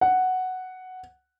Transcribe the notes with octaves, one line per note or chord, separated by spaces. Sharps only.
F#5